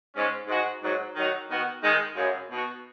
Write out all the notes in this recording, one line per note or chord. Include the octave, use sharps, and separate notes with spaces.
G#2 G#3 C#4
G#2 G#3 D#4 F#4
G#2 F#3 D#4 F#4
D#3 F#3 D#4 F#4
D#3 B3 F#4
D#3 G#3 D#4
F#2 C#3 G#3
B2 B3 D#4 F#4